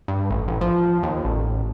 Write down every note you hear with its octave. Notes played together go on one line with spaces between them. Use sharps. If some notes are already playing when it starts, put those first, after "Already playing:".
G2
A1
A1
F3
D#2
A1